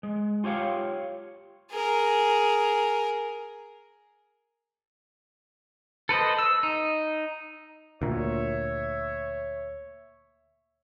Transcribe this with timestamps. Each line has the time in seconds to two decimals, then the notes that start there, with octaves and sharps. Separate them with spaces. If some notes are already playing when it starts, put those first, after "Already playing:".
0.03 G#3
0.44 F4 G4 C#5 F5
1.71 G#4 A#4
6.09 A4 B4 C5 D#5
6.39 E6
6.63 D#4
8.02 D2 A#2 C#5 E5